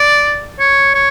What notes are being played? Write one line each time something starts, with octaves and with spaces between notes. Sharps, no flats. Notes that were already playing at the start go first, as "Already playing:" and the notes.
Already playing: D5
C#5
C#5